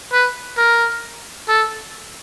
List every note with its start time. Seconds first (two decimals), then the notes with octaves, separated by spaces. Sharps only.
0.13 B4
0.58 A#4
1.48 A4